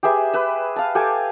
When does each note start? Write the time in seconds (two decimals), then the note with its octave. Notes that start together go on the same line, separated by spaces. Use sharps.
0.03 G4 G#4 B4 E5
0.34 B4 E6
0.76 F5 A5
0.95 G4 A4 G#5